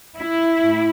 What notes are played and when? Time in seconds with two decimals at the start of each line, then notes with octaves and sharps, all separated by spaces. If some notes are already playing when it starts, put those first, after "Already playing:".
0.18 E4
0.61 A2